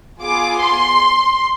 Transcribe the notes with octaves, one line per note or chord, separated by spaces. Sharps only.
B3 F4 G#4 D6
C6